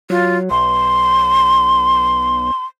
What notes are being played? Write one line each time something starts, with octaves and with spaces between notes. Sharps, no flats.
F#3 F4
B1 C6